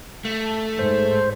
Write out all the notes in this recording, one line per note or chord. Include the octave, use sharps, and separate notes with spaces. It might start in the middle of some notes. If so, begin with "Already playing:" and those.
A3
G#2 C5